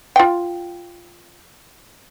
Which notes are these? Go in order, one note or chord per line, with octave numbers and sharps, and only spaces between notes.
F4 G5